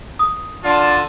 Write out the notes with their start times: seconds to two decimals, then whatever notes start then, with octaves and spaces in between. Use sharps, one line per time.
0.19 D#6
0.64 D3 F4 D5 A5